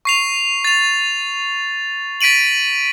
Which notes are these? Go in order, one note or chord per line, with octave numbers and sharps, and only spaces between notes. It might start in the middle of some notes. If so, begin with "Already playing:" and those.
C#6 C7 F7
A6 F7
A6 B6 D7 D#7 F#7